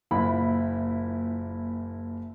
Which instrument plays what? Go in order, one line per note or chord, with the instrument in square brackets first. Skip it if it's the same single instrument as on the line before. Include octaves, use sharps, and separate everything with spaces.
[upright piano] F#1 A#2 E4 B5